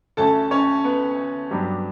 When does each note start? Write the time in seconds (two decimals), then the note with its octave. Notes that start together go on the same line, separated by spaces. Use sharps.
0.17 D2 D3 A3 C#4 A4 A5
0.51 C#4 C#5
0.84 B3 B4
1.51 G2 F#3 B3 D4 G4